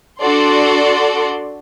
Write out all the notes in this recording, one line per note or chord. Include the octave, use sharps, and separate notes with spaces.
D4 F#4 A4 D5 C6